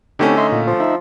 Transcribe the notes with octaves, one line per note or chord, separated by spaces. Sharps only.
D3 A3 C4 C#4 D#4 G4
D#4 E5 C6
A#2 F4
F3
D#4 E5